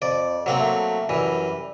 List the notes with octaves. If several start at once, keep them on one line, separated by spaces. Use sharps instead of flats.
F2 D5
F#3 A#3 C4
A3
F#2 E3 G3